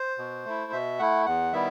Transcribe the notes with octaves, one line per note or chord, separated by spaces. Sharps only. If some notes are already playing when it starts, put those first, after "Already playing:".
Already playing: C5
B2
A3 E4
B2 E5
A3 E4 F#5
E2 F#5
D#3 G3 B3 E4 E5